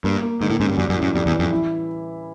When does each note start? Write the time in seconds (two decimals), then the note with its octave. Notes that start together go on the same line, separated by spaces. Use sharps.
0.04 G2 A#3
0.22 A#3
0.41 G#2 D3
0.50 A2
0.59 G#2 C#4
0.69 G2
0.77 F#2 G3
0.89 F#2
0.96 A2
1.02 F#2
1.14 F2 G3
1.26 E2
1.33 E3
1.39 F2
1.51 E4